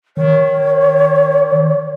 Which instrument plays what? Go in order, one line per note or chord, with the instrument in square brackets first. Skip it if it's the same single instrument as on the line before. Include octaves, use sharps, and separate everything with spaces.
[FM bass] D#3 [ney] C#5